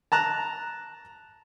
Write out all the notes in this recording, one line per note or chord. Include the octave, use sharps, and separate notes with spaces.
A5 A#5 F#6